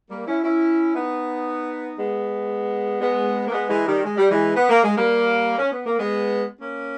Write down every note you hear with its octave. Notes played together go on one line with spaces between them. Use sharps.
G3 A#3
C#4 E4
C#4 E4
B3 D#4
G#3 B3
G#3 B3
A#3
G#3 B3
E3 G#3
D#3 G3
G#3
G3
E3 G#3
B3
A#3
G#3
G3 A#3
C#4
B3
A#3
G#3 B3
A#3 C#4